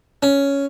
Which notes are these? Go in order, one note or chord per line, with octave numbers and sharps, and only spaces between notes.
C#4